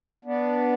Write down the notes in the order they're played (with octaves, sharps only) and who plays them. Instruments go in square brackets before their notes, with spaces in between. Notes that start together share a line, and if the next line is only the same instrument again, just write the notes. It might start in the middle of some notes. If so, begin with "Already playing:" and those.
[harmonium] B3 D4